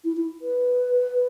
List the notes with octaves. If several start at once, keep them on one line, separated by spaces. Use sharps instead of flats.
E4
E4
B4